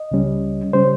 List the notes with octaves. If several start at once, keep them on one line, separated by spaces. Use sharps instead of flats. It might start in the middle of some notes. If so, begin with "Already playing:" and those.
Already playing: D#5
C#2 C#3 G3 C#4
C#3 G3 C#4 C5